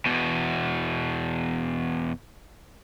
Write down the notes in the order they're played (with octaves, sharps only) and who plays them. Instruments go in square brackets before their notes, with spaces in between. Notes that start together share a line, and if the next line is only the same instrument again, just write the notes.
[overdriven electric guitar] E2 B2